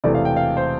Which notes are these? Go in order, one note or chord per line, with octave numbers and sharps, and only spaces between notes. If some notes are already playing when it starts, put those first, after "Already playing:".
E1 E2 C3 E3 A3 D5
F5
G5
F5
C5